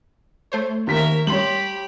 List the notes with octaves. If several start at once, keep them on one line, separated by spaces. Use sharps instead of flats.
A3 C5 C#5
D#2 A#4 E5 B6
G3 G4 C#5 B5 C6 F#7